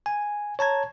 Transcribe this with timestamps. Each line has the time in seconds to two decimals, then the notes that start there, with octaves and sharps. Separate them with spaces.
0.06 G#5
0.59 C#5 A5 A#5 G#6